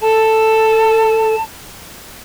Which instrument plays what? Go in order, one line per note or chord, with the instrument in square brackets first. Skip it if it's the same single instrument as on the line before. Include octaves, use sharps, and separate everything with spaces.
[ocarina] A4 [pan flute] A5